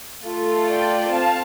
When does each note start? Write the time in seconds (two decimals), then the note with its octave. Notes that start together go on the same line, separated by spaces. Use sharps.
0.23 A3 F4 A4
0.67 D5 G5
1.11 C4 F5 A5